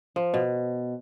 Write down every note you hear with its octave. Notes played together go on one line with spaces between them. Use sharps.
F3
B2